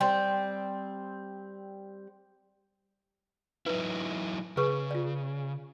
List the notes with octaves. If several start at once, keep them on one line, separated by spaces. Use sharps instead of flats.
G3 C4
F#3 D#4 E4 B4
C#3 G#4 B4 C#6
F4 D5